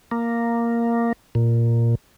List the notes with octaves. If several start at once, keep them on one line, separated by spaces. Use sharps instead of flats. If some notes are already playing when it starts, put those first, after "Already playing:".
A#3
A#2